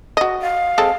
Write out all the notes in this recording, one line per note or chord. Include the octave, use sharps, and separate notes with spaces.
F#4 D#5
F5
G#3 C4 A4